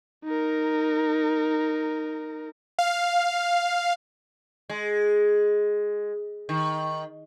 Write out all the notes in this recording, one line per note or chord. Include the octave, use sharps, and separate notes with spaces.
D#4 A#4
F5
G#3
D#3